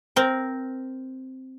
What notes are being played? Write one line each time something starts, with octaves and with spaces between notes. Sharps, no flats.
C4 A#4